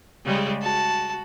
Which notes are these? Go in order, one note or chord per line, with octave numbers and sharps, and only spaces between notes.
C#3 G3 G#3
F#4 A5